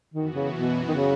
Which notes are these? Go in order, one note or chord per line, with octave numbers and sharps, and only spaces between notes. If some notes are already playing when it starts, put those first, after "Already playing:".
F#2 D#3 E3 B3 F#4
C#3
B2
D#3
C#3